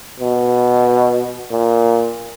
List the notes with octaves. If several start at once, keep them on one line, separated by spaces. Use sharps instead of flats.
B2
A#2